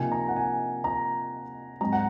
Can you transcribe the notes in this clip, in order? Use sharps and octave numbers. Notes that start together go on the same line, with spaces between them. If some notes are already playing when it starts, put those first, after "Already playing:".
Already playing: C3 F3 A#3 D#4 G#5
A#5
F#5
G#5
A#5
G#2 F#3 C4 D#4 A#5
F#5